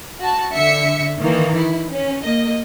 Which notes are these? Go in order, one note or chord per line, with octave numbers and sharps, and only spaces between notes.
F#4 A5
D3 E5 C#7
D#3 E3 A#3
E4
C#4
A#3 D#5